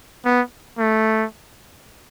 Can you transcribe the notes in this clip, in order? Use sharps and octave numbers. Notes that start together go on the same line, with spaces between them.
B3
A3